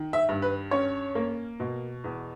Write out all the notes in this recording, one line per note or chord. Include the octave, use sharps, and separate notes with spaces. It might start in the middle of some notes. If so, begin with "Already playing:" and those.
Already playing: D#3
E5
G2
B4
C#4 C#5
A#3
B2
E2